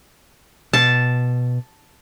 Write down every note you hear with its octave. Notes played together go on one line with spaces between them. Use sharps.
B2 A5